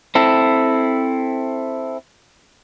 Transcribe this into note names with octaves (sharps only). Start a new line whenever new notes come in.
C4 E4 A4